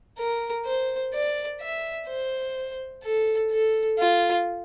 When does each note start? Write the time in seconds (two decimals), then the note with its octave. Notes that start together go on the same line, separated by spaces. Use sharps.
0.19 A#4
0.65 C5
1.13 D5
1.61 E5
2.08 C5
3.04 A4
3.51 A4
3.99 F4